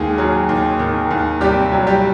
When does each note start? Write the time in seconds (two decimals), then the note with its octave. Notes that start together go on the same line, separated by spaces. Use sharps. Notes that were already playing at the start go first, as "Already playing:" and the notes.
Already playing: D#2 D#3 G#3 G#4
0.18 F#3
0.49 D#2
0.79 D#3
1.11 D#2
1.41 C3 G3 G4
1.72 F#3
1.87 G3 G4